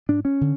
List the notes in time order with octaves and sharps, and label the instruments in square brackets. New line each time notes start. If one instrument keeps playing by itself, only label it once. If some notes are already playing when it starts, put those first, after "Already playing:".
[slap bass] G#2 D4
C#4
D3